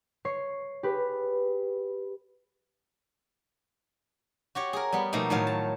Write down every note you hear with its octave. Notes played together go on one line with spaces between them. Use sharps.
C#5 C#6 C7 C#7
G4 G#4 B4
F#4 G4 C#5
G#4 A#4
G3 B3
B2 F3 A3 A#3 D#4
A2 D#3 F#3 F5
A5